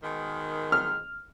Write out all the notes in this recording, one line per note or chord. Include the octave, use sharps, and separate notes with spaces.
G#2 B2 D#3
F6